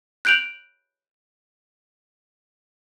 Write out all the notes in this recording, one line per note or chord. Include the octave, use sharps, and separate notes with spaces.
F#6 G6 D7 F7 F#7